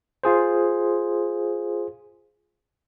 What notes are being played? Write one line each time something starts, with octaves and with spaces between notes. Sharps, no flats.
F4 G#4 C5